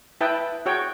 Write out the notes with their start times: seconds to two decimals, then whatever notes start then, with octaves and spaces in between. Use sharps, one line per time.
0.21 E4 B4 E5 G5 A5 D#6
0.66 F#4 G#4 C#5 G5